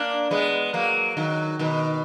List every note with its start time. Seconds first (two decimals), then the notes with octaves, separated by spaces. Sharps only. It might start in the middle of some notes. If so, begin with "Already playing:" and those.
Already playing: A#3 D4
0.31 G#3 B3
0.73 F#3 A#3
1.17 D#3 F#3
1.59 B2 D#3